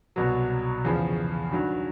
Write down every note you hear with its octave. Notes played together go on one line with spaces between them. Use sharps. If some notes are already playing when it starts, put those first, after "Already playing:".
C2 B2 F#3
E2 C#3 F3
G2 D#3 F#3